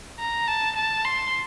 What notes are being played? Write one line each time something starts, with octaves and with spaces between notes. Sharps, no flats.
A#5
A5
A5
C6